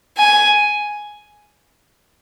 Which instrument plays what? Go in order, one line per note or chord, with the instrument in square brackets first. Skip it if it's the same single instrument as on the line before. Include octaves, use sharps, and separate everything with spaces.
[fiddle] G#5